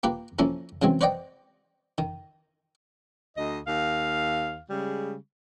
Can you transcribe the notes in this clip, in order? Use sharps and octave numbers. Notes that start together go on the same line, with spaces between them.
A#3 F4 G4 B4
F3 A#3 C#4 E4 A4
C#3 E3 F#3 G#3 C4
B4 C5 D5 D#5 F#5 G5
D#3
D2 D#5
D#2 F5
C#3 G3 G#3